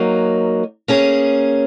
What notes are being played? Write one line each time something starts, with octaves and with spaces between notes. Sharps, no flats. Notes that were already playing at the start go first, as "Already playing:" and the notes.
Already playing: F#3 A#3 D#4
A#3 C#4 G#4